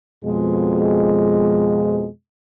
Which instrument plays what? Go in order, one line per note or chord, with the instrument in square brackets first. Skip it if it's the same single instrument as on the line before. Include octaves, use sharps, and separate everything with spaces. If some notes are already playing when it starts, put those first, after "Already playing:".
[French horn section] F2 B2 G#3